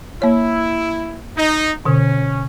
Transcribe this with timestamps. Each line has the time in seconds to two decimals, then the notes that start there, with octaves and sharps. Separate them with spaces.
0.22 A#3 E4 C#5
1.37 D#4
1.85 B2 D3 C#4